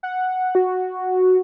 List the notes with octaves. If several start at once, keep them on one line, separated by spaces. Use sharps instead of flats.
F#5
F#4